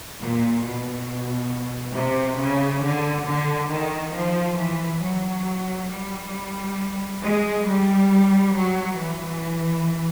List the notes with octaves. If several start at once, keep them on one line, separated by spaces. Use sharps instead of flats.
A#2
B2
C3
C#3
D3
D3
D#3
F3
E3
F#3
G3
G#3
G3
F#3
E3